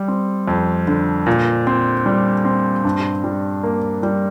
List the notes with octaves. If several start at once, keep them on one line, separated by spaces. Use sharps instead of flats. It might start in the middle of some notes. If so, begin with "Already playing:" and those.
Already playing: G3
C4
F2
D3
A#2
C4
G3
C4
G2
G3
A#3
G3